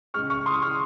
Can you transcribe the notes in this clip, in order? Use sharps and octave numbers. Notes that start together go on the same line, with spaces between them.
C#3 G#3 C#6 F6
C#6 F6
C6 D#6
C#6 F6